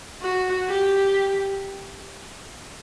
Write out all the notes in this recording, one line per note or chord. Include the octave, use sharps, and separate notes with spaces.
F#4
G4